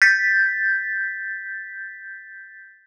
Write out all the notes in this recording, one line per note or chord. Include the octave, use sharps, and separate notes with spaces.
G6 A6 B6